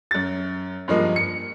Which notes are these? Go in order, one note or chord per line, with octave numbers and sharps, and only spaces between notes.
F#2 A6
G2 F3 G#3 A#3
C#7